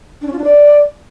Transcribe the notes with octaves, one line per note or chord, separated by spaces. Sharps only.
D4
C#4
F4
D4
D5